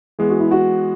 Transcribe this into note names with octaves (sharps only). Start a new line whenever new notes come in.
E3 G#3 B3 G#4
F#4
E4
F#4